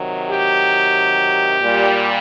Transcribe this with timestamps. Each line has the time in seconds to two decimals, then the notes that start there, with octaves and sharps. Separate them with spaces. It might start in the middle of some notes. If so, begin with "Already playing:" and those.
Already playing: C3 D#3 F#3
0.30 G4
1.60 A#2 G3